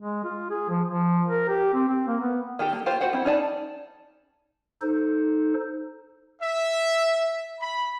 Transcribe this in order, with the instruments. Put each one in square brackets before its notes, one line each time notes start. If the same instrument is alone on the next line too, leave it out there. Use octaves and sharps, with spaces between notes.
[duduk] G#3
F4
G#4
F3
F3
A#4
G4
C4
C4
A#3
B3
[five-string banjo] D#3 D#4 G4 A4
A#3
A#3 F4 G4 C5
F#4 C5 F#5 G5
C4 E4
C#4 D#4 D5 A5
[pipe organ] D#4 A4 C5
[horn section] E5
B5